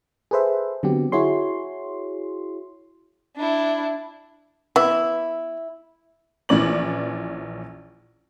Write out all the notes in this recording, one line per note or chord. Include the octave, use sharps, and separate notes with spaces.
G#4 A4 B4 C5 E5
D3 F#3 B3 C4 G4
E4 F#4 G#4 C#5 C6
D4 E4
E3 B3 E4
A#1 E3 C#4 D5 F#7